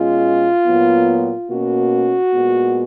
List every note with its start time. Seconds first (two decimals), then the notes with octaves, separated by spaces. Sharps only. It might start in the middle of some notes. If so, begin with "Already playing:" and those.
Already playing: B2 G#3 C#4 F4
0.66 A#2 F#3 B3
1.49 B2 A#3 C#4 F#4
2.32 A#2 G#3 B3